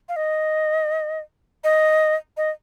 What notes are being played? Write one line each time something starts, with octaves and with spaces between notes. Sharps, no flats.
F5
D#5
D#5
D#5